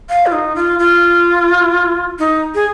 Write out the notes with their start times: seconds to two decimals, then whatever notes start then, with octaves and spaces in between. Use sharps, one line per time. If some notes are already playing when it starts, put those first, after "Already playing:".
0.09 F5
0.26 F4
0.32 D#4
0.56 F4
0.79 F4
2.19 D#4
2.55 G#4